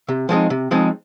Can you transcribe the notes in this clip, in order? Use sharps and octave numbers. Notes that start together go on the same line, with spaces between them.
C3
F3 G#3 C4 D#4
C3
F3 G#3 C4 D#4